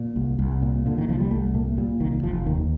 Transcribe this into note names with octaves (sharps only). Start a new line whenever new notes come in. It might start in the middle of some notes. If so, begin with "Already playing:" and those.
Already playing: A#2
C2
C2
A#2
A#2 D3
D#3
C2 F3
G3
C2 A3
A#2 A3
A#2 G3
C2 D#3
F1 F3
D#2 D#3